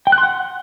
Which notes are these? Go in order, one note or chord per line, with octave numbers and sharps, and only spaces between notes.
G5
F#6
C6
F#5